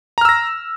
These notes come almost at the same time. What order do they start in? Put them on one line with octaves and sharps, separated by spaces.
A#5 F6 E6 A#6